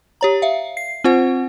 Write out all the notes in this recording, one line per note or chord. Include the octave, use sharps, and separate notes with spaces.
G4 C#5 A#5
E5 F5
C7
C4 F4 C5 F#5